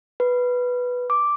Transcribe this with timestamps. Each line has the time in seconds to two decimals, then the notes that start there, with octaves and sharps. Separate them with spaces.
0.20 B4
1.10 D6